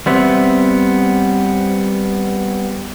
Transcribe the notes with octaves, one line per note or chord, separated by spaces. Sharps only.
G3 B3 C4 E5